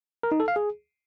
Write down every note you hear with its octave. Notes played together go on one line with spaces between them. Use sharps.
A#4
D#4
A4
F5
G#4